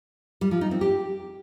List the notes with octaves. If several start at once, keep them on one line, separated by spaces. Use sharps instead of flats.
G3
F3
D#4
C4
G4